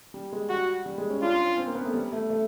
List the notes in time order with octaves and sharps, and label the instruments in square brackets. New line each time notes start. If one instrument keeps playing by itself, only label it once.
[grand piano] G3
G#3
[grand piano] G3 [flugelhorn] F#4
[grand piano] G3
G#3
C#4
[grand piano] D4 [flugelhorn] F4
[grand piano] C#4
C#4
C4
A#3
B3
A3
G3
A3
A3